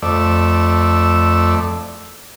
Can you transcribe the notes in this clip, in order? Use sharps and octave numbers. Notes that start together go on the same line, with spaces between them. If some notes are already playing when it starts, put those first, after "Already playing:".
F2 A3 D5 E6